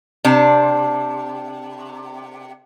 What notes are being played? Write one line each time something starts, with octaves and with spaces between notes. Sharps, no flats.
C3 D4